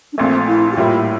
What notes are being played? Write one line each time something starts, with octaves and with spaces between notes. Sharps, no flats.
D4
A#1 A#2 A3 C4
E4
G4
A2 G3 A#3 E4 F4